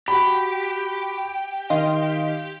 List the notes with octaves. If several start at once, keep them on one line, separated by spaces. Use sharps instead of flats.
F#4 G4 B5
D#3 D#5 F5 C6